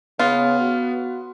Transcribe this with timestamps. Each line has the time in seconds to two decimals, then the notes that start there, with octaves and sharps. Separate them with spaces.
0.19 C#3 B3 F4
0.59 F#4